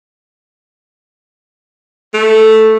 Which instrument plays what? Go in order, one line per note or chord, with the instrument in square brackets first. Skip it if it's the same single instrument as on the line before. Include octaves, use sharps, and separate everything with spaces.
[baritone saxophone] A3